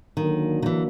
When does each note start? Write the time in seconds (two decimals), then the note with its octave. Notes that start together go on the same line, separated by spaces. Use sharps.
0.17 D3 D#3 F#3 A#3
0.62 D#3
0.66 E3